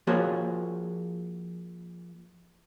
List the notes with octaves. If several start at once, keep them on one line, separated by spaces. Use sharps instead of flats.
F3 A#3 F#4 G#4 C#5